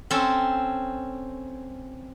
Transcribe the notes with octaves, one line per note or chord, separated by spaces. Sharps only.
C4 C#4 A4